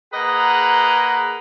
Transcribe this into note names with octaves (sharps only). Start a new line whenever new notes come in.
A#3 G#4 B4 D#5 F#5 A#5